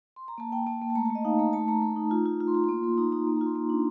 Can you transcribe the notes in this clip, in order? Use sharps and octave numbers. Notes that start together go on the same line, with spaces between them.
C6
A#5
A#3 A5
A#3 G5
A#3 A5
A#3
A5
A3 A#5
A5
A3
D#5
D#4 F5
A3 A#5
A3 A5
A3 A#5
A3
D#4
F4
F4
F4
C6
F4 A#5
A#3 C6
A#3
D#4 A#5
D#4 A#5
A#3
A#5
F4
C6
A#3
D4